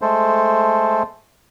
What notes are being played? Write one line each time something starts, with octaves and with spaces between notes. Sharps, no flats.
G#3 A3 A4 C5